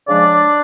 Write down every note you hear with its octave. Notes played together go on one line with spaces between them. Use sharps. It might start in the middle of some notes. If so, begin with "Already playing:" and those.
C#3 F3 G#3 D4 D5